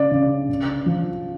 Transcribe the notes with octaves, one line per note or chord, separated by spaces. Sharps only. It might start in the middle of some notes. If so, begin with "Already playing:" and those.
Already playing: C#3 D5
C#3
C#3
F3